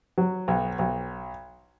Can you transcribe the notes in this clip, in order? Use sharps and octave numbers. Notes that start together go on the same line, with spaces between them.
F#3
B1
B1